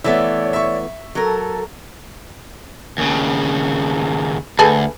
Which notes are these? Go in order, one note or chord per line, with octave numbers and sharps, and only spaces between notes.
E3 A3 B3 C#5 D5 E5
E5 C#6
F#3 A4 A#4
D#2 C#3
D2 G#4 A4 B4